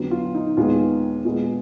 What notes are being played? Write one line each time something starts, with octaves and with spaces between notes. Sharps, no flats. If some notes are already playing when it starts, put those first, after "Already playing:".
Already playing: F2 D3 F#3 B3
F4
D#4
D#2 D#3 G#3 B3 F4
A#2 G#3 B3